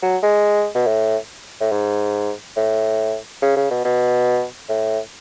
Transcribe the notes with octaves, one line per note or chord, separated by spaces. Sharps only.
F#3
G#3
B2
A2
A2
G#2
A2
C#3
C#3
B2
B2
A2